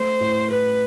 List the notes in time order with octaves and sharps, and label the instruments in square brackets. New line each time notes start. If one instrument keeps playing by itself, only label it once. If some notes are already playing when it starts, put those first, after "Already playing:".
Already playing: [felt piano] A3 [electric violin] C5
[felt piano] A2
[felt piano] A2 [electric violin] B4